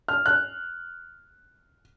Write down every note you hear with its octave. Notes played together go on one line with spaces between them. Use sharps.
F6
F#6